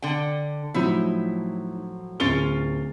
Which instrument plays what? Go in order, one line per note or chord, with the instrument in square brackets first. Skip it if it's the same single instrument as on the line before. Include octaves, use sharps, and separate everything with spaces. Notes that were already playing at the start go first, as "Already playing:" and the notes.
[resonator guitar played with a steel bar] D3 G5
[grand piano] A2 F3 F#3 [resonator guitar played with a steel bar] D#4 E4
[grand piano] D1 A6 G7 [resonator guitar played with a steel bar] C#4 F4 A#4